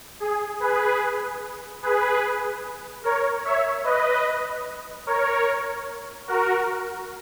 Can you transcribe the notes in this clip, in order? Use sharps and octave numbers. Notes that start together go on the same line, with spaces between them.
G#4
G#4 B4
G#4 B4
A#4 C#5
C#5 E5
B4 D#5
A#4 C#5
F#4 A#4